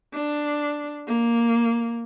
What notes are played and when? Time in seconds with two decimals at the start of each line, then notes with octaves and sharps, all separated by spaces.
0.13 D4
1.07 A#3